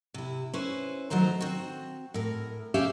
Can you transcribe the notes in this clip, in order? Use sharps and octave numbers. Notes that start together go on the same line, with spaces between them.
C3 E4
C#4 E4 B4 C5
D#3 F#3 A3 C5 A#5
C4 F#4
A2 A#4
C3 C#4 G4 G#4 E5 F5